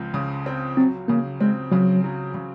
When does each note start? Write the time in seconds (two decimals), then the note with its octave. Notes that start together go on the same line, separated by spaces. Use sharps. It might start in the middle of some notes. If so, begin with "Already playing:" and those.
Already playing: C#2 F3 C4
0.14 C#3
0.46 C4
0.77 F#3 C4
1.08 C#3 A#3
1.40 G#3 C4
1.72 C#3 F#3
2.04 F#3
2.34 C#3